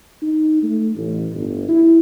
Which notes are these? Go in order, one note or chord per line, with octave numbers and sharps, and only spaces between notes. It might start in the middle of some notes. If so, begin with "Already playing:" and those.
D#4
A3
A1
G1
E4